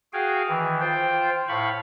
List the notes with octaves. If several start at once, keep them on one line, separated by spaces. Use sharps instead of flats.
F#4 G#4 F5 G5 G#5
D#3 E3
F4 C5 G5
A2 F5 B5 C#6